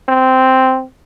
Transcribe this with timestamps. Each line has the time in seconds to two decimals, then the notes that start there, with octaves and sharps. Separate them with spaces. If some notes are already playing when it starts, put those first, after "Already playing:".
0.08 C4